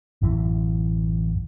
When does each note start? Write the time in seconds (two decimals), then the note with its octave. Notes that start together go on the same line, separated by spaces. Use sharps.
0.22 A1 F#2 E3